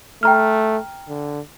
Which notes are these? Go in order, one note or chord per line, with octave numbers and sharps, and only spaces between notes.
A3 G5 A#5 F6
D3